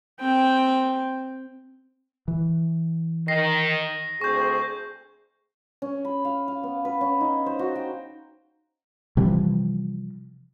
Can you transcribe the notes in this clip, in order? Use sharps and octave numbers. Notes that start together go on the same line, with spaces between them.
C4 G5
E3
D#3 A#6 C7
D2 C4 G#4 C#6 G6
C#4
B5
F5
F5
B3
B4
C#4
D#4
C5
F#4
G5
C3 E3 F3 G3